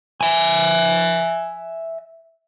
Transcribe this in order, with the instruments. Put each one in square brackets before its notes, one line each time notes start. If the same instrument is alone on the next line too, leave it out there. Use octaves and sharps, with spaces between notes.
[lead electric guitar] E5 G#5